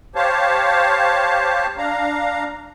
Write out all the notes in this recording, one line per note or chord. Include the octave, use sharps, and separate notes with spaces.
G4 C5 C#5 F5 A5
D4 F5 A#5